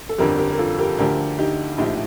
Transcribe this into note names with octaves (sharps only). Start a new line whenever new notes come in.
A4
G1 F2 D3 G4 A#4
G4 A#4
A#4
F4 A4
G4 A#4
D2 D3 F3 G4 A#4
D#4 G4
A#1 A2 F3 D#4 G4